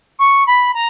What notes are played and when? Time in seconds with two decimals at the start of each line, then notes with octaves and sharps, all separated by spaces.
0.19 C#6
0.47 B5
0.74 A#5